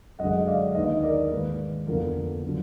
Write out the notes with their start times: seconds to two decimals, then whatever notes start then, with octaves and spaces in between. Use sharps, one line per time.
0.19 F#2 D3 G#3 D#5 F#5
0.47 D5 F5
0.75 D#2 D#3 A#3 D#4 B4 D#5
1.03 A#4 D5
1.31 G#2 D#3 A#3 B4
1.87 F2 D3 F3 B3 A#4
2.45 D3 F#3